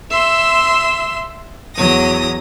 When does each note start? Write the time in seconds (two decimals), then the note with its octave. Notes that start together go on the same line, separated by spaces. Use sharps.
0.11 E5 C6 E6
1.75 E2 F#3 D#6 A#6